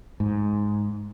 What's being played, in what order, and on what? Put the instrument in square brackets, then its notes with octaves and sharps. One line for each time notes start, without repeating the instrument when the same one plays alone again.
[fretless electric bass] G#2